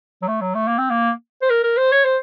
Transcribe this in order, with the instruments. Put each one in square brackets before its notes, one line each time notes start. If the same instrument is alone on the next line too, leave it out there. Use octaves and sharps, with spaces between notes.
[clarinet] F#3
A3
F#3
A3
A#3
C4
A#3
C5
A#4
A#4
C5
C#5
C5